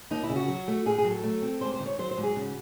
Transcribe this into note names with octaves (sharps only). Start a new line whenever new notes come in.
D#2 D#4
E4
C#3
F#4
F#3
A3
A2 G#4
G#4
F#3
A4
A3
C4
G#2 C5
C5
D#3
C#5
F#3 C5
C5
G#2
G#4
C#3 F#4